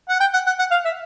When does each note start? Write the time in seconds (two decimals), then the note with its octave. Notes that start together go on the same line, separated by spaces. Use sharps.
0.09 F#5
0.20 G5
0.34 F#5
0.46 F#5
0.59 F#5
0.71 F5
0.85 E5